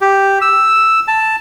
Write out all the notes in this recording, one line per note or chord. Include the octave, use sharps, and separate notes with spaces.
G4
E6
A5